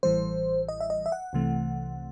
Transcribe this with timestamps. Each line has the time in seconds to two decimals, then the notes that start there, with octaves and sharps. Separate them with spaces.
0.03 A1 A2 E3 G3 C5
0.68 D#5
0.80 E5
0.90 D#5
1.06 E5
1.12 F#5
1.33 C2 C3 E3 A3